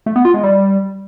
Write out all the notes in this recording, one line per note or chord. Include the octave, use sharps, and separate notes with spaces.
A3
B3
F4
G#3
G3